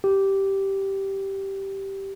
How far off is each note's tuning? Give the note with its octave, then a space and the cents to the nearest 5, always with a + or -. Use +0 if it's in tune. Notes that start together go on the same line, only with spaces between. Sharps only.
G4 -10